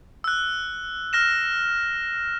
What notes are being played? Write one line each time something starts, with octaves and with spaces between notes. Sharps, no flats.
E6 F#6
F6 A#6 E7